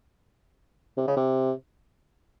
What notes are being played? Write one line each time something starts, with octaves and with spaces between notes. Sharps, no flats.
C3
C#3
C3